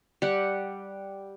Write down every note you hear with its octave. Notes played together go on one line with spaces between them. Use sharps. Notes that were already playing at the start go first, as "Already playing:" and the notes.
G3 F#5